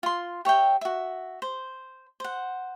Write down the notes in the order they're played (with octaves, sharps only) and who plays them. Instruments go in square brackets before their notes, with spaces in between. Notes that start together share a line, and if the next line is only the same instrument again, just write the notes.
[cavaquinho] F4 C6
G4 C#5 E5 G5
F#4 E5
C5
C5 F#5